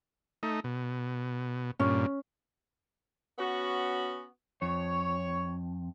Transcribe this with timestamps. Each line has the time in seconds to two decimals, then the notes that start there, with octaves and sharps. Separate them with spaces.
0.43 A3 D#4
0.64 B2
1.80 G2 A#2 C#4
3.39 B3 C#4 F#4
4.62 F2 C#5